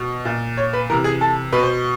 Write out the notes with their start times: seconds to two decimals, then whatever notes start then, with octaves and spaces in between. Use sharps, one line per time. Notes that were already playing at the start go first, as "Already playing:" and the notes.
Already playing: B2
0.25 A#2
0.57 C#5
0.73 B4
0.90 C3 E3 A#4
1.04 G#4
1.21 A4
1.52 B2 B4
1.63 C5